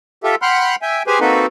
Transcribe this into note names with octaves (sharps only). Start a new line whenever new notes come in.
F4 G4 A4 E5
F#5 G5 B5 C6 F6 F#6
E5 G5 G#5
G4 G#4 B4 C5 G#5
A#3 C4 D#4 F#4 A4 B4